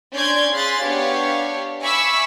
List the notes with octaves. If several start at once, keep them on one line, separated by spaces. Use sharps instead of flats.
C#4 D4 D5 C6 G6 G#6
G#4 F5 B5 C6 F#6 A6
B3 D4 G4 C#5 F5
E5 G#5 B5 C#6 D6 E6